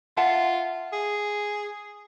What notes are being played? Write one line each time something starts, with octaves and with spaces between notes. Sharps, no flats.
F4 E5 F#5 A5
G#4